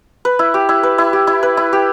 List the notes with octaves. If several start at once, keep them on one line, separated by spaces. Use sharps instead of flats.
B4
E4
G4
E4
B4
E4
G4
E4
B4
E4
G4